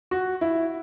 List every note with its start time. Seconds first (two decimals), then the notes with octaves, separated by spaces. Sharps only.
0.11 F#4
0.41 E4